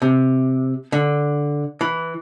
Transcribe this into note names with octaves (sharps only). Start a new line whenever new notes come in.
C3
D3
E3